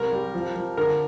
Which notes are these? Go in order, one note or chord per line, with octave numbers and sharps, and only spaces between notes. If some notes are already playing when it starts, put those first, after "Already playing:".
Already playing: C2 A#4
G3
F3
F3
D3 A#4